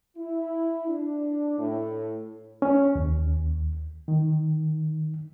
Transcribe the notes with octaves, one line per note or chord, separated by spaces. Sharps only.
E4
D4
A2
C#4
D#2
D#3